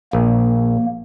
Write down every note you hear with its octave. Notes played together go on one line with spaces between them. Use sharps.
A#1 A#3